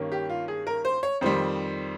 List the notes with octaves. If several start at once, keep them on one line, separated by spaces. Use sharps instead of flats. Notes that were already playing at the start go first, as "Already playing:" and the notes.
Already playing: G2 D#3 A#3 C#4
G4
F4
G#4
A#4
C5
C#5
F2 D#3 G3 C5